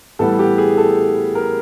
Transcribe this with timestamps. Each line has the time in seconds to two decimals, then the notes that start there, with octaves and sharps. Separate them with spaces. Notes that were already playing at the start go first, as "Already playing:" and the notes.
0.19 A2 E3 G3 B3 A4
0.39 G4
0.58 G#4
0.77 A4
1.35 A#4